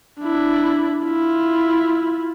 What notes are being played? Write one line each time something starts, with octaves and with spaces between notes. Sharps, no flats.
D4 E4
E4 F4